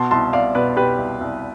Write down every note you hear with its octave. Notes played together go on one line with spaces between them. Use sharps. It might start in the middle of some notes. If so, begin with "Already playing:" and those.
Already playing: B2 A5 C6
C2 A5 C6
C2 D5 F5
B2 B4 D5
B2 G4 B4
C2
C2